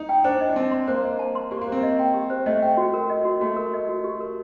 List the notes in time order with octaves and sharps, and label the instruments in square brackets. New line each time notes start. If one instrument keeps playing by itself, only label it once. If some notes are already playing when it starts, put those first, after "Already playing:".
Already playing: [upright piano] D#4
[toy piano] G5
[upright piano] D4 [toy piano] C5
[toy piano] D#5
[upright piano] D4
[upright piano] C4 [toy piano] A5
[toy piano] C6
[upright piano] A#3 [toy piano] C5
[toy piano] D#5
A5
C6
[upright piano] A#3 [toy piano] G4
[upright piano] A#3
[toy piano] C5
[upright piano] C4
[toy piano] D#5
G5
G4
C5
[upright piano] A3 [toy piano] D#5
[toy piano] G5
F#4
A#4
D#5
F#4
[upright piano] A3 [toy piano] F#4
[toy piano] A#4
D#5
F#4
G4
A#4